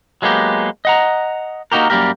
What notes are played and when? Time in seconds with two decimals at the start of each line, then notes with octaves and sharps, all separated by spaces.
0.22 F#3 G#3 A#3 B3 G4
0.85 D#5 F#5 A#5
1.72 A#3 D#4 F#4 G4 A#4
1.90 F#2 G3 A#3 G4 A#4